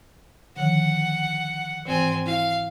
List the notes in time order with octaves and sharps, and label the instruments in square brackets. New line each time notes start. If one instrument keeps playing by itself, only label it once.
[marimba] D3 D#3 F3 [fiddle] F#5
[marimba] G#2 E3 [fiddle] C4 G#5
[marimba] E4 [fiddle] F5